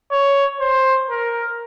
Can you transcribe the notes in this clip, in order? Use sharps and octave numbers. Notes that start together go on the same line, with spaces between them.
C#5
C5
A#4